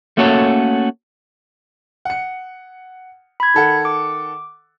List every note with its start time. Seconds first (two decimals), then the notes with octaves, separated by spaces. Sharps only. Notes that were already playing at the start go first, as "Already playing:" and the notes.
0.17 A3 A#3 C#4 F#4 A4 C#5
2.05 F#5 C#7
3.40 B5 G#6
3.54 D#3 A4 F#5
3.85 D6